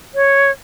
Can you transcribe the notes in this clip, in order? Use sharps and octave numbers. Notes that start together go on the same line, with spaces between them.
C#5